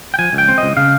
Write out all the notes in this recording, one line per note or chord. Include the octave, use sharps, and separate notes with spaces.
G5
F3 G#5
C#2
G5
C4
D#5
C#2
C#3 F5